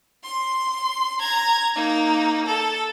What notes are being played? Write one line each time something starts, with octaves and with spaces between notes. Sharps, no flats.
C6
A#5 G#6
A#3 D#4
A4